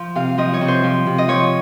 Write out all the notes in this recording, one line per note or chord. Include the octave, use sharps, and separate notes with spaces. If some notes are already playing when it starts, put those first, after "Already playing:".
Already playing: F3
C3 F5
F3 D#5
C#5
C3
C5
F3
C3
D#5
F3 C#5